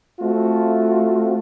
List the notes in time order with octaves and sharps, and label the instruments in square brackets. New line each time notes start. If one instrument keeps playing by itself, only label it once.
[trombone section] A3 C4 F4 F#4